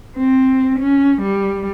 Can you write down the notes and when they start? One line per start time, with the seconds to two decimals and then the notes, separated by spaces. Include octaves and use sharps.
0.17 C4
0.79 C#4
1.22 G3